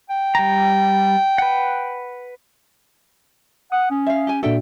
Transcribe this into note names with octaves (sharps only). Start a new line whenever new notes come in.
G5
G3 A#5
B4 F#5
F#5 D#6
C#4
E5 F5
G4 G#5
A#2 D4 F#4 A4 E5 G5